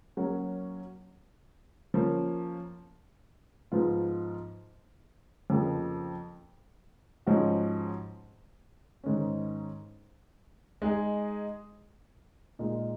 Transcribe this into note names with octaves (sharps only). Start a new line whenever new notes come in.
F#3 A#3 C#4 F#4
F3 A#3 C#4
G#2 F3 B3 F4
F2 C#3 F3 A#3
G#2 F3 G#3 C#4 F#4
G#2 D#3 G#3 C#4
G#3 D#4 G#4 D#5
A#2 G#3 D#4